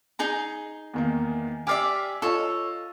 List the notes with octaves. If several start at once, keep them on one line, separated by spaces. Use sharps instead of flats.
D#4 G#4 A#5
E2 D#3 A#3
G4 D5 E5 G#5 F6 C7
F4 A4 C#5 D#5